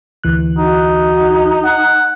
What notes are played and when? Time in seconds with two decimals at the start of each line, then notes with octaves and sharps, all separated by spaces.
0.24 D2 E3 F#6
0.58 D#4 F#4
1.65 F#5